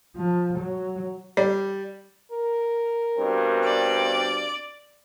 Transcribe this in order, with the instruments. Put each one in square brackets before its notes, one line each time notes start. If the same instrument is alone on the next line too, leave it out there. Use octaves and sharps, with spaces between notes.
[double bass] F3
F#3
[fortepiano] G3
[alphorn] A#4
[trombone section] G2 B2 C4
[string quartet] D5